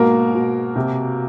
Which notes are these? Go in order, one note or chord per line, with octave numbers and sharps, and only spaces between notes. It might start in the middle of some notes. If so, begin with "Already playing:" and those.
Already playing: G#2 B2 A#3 A#4
B2
C3